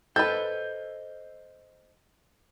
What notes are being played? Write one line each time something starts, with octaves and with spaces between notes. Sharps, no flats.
A4 B4 C5 D#5 G6